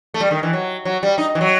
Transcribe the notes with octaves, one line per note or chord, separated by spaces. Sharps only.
A3
G3
D#3
E3
F#3
F#3
G3
D#4
E3
F#3